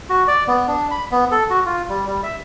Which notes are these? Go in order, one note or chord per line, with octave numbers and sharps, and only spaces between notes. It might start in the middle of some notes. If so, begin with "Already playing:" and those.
F#4
D5
B3
D4
B5
B3
A4
F#4
F4
G3
G3
E5